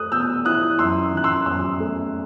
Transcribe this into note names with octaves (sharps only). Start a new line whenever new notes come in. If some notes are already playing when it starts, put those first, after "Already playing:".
Already playing: A3 D#6 F#6
B2 E6 G6
E4 D#6 F#6
F#2 C6 E6
D#3 F#6
C6 E6
F#2 C6 E6
A3